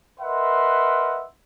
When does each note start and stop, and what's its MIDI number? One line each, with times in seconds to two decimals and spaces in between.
0.20 1.25 70
0.20 1.25 71
0.20 1.25 75
0.20 1.25 76
0.20 1.25 78
0.20 1.25 84